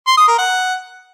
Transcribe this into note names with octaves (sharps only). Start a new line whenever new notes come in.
C6
D#6
A#4
F#5